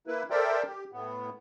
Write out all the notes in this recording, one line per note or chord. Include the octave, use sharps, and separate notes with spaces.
A#3 E4 B4
A4 A#4 C5 D5 E5 G5
G4
A2 B3